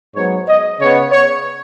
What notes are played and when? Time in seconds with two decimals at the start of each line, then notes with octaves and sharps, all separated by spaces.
0.15 G#2 F#3 B3 C#5
0.47 D#5
0.79 C#3 B3 C#5
1.11 C#5